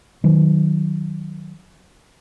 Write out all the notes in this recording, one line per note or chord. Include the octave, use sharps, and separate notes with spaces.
D#3 F#3